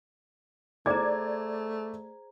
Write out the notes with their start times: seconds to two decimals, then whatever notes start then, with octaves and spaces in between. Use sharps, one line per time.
0.86 A3 G#4 C5 D5 A#5 D6 G#6